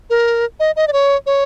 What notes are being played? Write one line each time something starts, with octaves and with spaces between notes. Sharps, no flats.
A#4
D#5
D#5
D5
C#5
C#5